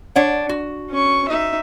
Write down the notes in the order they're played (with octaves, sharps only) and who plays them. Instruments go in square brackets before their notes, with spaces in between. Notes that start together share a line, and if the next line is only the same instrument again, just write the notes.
[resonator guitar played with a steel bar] D4 C#5 F#5
F#4
[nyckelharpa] C#4 C#6
D#4 E5